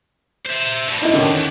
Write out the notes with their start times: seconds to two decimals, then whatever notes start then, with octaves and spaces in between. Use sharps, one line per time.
0.46 C5 E5
0.88 G2 B2
1.02 D#4 E4
1.13 D3 D#3 C#4
1.32 E2